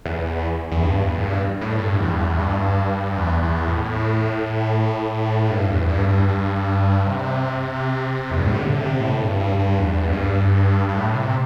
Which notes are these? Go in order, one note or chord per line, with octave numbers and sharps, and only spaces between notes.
E2
E2
G2
E2
A2
G2
A2
G2
E2
G2
E2
G2
E2
E2
A2
G2
E2
G2
G2
G2
C3
E2
G2
A2
C3
D3
C3
A2
G2
G2
G2
E2
G2
E2
G2
G2
A2
C3